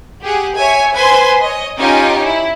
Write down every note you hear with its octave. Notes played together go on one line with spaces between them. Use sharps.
G4 G#4 F#5
C#5 E5 G#5
B4 C5 G#5 C6
C#5 D#5
C#4 D#4 F4 G4 G5 G#5
E4